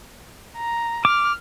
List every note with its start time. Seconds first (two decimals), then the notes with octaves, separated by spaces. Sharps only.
0.57 A#5
1.05 D6 F6